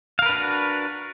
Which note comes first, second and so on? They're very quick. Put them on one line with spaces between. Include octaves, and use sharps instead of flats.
F5 A#4 B4 D4 F#4